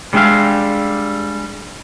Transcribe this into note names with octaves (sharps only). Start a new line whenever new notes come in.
G3 G#3 D4 G4 E5 F5